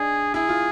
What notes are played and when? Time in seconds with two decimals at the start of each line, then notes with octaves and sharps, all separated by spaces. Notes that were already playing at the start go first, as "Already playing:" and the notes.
Already playing: D4 D#4 G#4
0.34 E4 G#4
0.49 F4